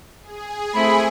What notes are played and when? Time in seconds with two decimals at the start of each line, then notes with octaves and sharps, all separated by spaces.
0.22 G#4
0.74 A3 C4 E4 B5